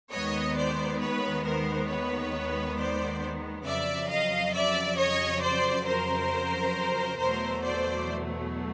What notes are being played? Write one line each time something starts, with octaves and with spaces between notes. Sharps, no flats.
D#2 D#3 G#3 B3 C#5 D#5
C5 D5
B4 C#5
A#4 C5
B4 C#5
C5 D5
F2 C#3 F#3 D5 E5
D#5 F5
D5 E5
C#5 D#5
C5 D5
A#4 C5
E2 B2 F#3 A3 A#4 C5
C5 D5